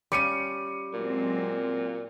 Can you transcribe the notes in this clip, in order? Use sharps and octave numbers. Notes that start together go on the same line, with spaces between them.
G3 C#4 F4 D6 C#7 D#7
A#2 F#3 G#3 C4